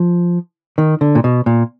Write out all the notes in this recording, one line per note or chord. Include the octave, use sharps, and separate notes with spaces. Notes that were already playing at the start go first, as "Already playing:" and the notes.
Already playing: F3
D#3
D3
A#2
B2
A#2